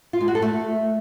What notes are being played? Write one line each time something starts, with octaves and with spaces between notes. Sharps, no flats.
F4
G#3
F#4
A4
A3